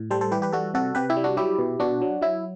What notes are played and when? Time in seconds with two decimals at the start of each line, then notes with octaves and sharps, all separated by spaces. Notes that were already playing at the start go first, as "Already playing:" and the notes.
Already playing: A2
0.11 G3 A4 C5
0.21 A4 C5
0.31 E3 G4 B4
0.42 G4 B4
0.52 G3 F#4 A4
0.74 C3 F#4 A4
0.95 C3 G4 B4
1.10 E4 G4
1.17 G3
1.24 D4 F#4
1.37 F#3 E4 G4
1.59 B2
1.80 B2 D4 F#4
2.02 F#3
2.21 F#3 E4